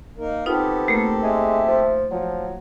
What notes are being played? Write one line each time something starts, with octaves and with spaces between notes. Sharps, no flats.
A#3 D#4 A#4
B3 C4 D#4 F4 G4 A4
A3 A#3 A#4
G#3 E5
F3
F3 F#3